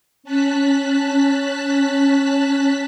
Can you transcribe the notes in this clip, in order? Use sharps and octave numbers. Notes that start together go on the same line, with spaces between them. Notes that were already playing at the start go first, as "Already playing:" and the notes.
C#4 A5 F#6 B6